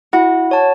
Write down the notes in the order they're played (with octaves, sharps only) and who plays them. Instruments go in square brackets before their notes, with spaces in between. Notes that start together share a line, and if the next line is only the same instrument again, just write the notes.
[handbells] E4 [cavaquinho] F#4
[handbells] C#5 A5